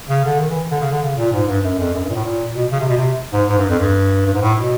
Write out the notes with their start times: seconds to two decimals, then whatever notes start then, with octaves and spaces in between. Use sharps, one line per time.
0.09 C#3
0.24 D3
0.39 D#3
0.50 E3
0.71 D3
0.81 C#3
0.92 D3
1.02 C#3
1.17 A#2
1.33 G#2
1.48 G2
1.64 F#2
1.79 F2
1.94 F#2
2.04 G2
2.10 A#2
2.15 A2
2.25 A#2
2.56 B2
2.72 C#3
2.80 C3
2.89 B2
2.97 C3
3.33 G#2
3.49 G#2
3.58 G2
3.69 F2
3.80 G2
4.27 G2
4.34 G#2
4.42 A2
4.57 B2